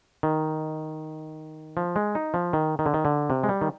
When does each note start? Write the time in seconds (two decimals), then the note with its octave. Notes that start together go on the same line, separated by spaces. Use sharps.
0.23 D#3
1.77 F3
1.96 G#3
2.15 D#4
2.34 F3
2.53 D#3
2.79 D#3
2.86 D3
2.94 D#3
3.05 D3
3.30 C3
3.44 G#3
3.49 G3
3.61 D#3